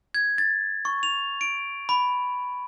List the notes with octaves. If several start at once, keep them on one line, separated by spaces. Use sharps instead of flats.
G#6
A6
C#6
F7
D7
B5